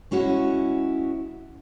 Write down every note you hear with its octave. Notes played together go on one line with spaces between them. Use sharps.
G#3 C#4 E4 F#4